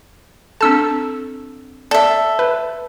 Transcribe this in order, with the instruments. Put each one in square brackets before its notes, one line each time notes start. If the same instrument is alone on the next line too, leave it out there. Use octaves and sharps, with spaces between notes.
[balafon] C4 D4 A4 [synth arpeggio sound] A5 E6
[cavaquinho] A4 E5 [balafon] D5
[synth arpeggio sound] B4